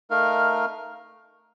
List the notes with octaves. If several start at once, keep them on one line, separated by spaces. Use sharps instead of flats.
A3 D#4 A#4 F5